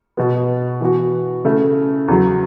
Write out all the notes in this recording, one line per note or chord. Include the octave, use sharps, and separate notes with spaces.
B2 B3 F#4
E3 B3 F#4
C#3 A3 E4
E2 C#3 F#3